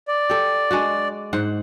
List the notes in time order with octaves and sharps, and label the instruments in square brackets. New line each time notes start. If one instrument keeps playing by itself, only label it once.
[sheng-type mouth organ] D5
[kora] G4 A4
G#3 D4 F#4
G#2 C5 F#5